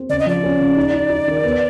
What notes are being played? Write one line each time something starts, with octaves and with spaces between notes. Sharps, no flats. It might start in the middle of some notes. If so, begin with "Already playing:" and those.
Already playing: C4
C#3 D5
D#5
F3 D5
C#4
C#3
D#4
D#4
D#4
D#3
B3